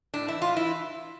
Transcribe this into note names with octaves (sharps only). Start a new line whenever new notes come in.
A2 D4
E3 E4
A2 F4
E3 E4